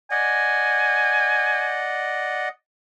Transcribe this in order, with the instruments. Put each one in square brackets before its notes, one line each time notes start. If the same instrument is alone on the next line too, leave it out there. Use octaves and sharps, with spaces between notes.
[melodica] D5 D#5 F#5 [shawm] G#5